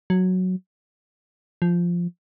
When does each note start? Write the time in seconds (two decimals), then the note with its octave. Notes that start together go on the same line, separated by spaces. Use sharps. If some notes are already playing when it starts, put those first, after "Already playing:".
0.10 F#3
1.62 F3